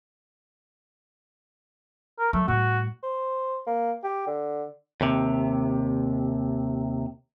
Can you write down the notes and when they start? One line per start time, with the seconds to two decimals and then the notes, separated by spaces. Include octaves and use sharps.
2.19 A#4
2.33 F#3 A3
2.48 A2 G3 F#4
3.03 C5
3.67 A#3
4.04 G4
4.27 D3
5.01 D#2 C3